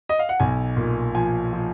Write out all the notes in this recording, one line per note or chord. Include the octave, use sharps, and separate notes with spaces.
D#5
F5
F#5
B1 G#5
A#2
F3 G#5
F3